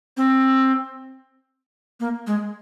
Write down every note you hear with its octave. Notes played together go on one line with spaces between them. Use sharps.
C4
A#3
G#3